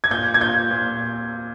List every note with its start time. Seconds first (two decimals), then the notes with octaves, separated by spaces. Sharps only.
0.04 G#6
0.11 A#2 G6
0.34 G#6
0.41 A#2 G6
0.71 A#2